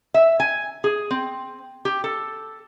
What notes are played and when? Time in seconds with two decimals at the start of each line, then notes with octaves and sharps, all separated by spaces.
0.14 E5
0.40 G#5
0.84 G#4
1.11 C4
1.85 G4
2.04 A4